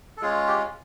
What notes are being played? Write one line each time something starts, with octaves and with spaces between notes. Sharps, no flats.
A4
G#3 C#4 F4 G#4
G4